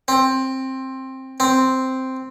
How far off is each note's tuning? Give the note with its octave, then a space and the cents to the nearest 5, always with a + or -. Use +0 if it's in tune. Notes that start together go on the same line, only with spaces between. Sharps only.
C4 +15
C4 +0